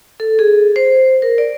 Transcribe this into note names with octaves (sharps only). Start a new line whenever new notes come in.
A4
G#4
C5
A#4
D5